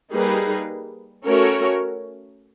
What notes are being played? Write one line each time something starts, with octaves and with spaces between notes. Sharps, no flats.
G3 A#3 D#4 G#4 B4
A3 C#4 F#4 A#4 C#5